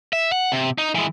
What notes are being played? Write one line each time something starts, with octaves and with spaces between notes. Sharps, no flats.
E5
F#5
C3
D#4
E3 G#3